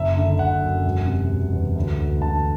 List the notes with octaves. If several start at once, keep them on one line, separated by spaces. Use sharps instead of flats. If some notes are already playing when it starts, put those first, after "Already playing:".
Already playing: F#1 E5
D3
F#1 F#5
F#2
E1
C3
E1
E2
D2
D2
D3 A5